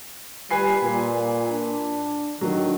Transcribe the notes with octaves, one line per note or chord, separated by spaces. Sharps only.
G3 B4 G#5 C7
A#2
D4
D3 D#3 F#3